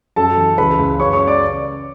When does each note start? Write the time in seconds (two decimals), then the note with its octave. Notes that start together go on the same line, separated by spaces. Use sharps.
0.16 F#2 A4 A5
0.37 E3
0.58 C#2 B4 B5
0.79 C#2
1.00 F#2 C#5 C#6
1.13 C#5 C#6
1.27 D5 D6